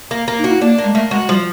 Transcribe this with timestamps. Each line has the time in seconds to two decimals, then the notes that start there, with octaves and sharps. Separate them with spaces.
0.11 A#3
0.28 A#3
0.38 D#4
0.44 F#4
0.50 E4
0.61 A#3 D4
0.78 A#3
0.84 G#3
0.94 A3 A#3
1.11 G#3 F#4
1.29 F3 G3